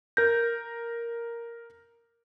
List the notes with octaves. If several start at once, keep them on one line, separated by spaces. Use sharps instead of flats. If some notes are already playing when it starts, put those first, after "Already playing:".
A#4 G6 A#6